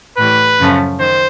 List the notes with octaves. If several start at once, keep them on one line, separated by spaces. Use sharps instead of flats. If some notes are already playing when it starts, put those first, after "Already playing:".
A2 E3 G3 B4
F#2 C#3 F3 A3 C#4
D#3 C5